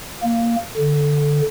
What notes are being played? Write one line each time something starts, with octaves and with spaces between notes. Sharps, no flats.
A#3
D3